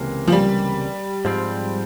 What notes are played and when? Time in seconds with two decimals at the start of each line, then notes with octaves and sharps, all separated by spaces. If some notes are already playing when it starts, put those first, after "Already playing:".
Already playing: C#2 C3 E3 A#3
0.28 F3
0.32 G3
1.25 G#2 F3 C4